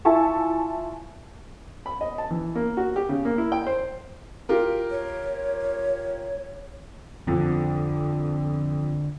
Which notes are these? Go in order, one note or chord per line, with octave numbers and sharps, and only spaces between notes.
E4 F4 E5 G#5 A5 C#6
B5
D#5
A5
E3
A#3
F#4
G4
C#3
A#3
E4
G5
C5
F4 G4 A#4
C#5
F2 D3 F3